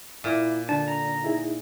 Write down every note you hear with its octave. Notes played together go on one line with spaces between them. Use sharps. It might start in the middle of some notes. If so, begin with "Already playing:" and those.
A#2 E4 E5 D6
D3 D4 A5
A#5
D#4 E4 G#4